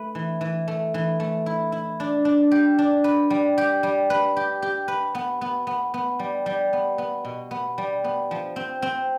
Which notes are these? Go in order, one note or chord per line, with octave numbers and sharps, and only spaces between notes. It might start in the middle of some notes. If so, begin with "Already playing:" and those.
Already playing: A3 B4
E3
E3
A3
E3
A3
E4
E4
D4
D4
G4
D4
B4
G3
G4
G3
B4
G4
G4
B4
B3
B3
B3
B3
G3
G3
B3
B3
B2
B3
G3
B3
F3
C4
C4